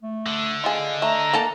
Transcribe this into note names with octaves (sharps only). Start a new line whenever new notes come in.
A3
D3
F4 G#4 D#5 F5
A3 A#5
A#3 A4 A5